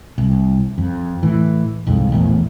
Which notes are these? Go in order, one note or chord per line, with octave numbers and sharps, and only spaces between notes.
C2
F2
A2 E3
C2 F2 G#2
A#1 E2 A2